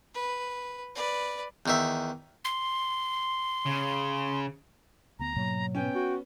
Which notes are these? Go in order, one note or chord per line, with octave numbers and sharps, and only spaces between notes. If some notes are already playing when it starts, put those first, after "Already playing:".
B4
B4 D5
E2 D#3 E5
C6
C#3
D2 D3 B3 A#5
G#2 B2 F#3 A#3
B3 C#4 G5
F#4